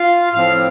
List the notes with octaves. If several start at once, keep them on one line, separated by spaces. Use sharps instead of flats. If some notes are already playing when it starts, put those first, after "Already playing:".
Already playing: F4 F5
A2 F3 C4 F5 F6